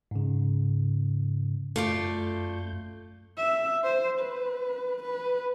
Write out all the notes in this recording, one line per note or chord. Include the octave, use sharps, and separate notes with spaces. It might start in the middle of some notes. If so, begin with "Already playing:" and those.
G#2 C#3
F#2 A3 F4 D5 G6
E5
C5
B4
B4